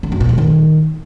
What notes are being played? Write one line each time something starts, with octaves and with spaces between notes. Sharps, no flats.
D3
F#2
A#2
G3
D#3